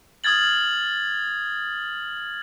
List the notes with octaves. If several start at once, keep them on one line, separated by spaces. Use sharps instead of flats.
D#6 F6 G#6 A6 F#7